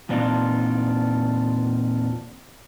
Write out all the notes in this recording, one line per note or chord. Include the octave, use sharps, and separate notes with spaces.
E2 A#2 C4 D4 D#4 F4